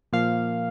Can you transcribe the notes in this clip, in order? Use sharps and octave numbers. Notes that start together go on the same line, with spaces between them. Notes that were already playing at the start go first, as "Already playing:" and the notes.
A#2 F3 A#3 F5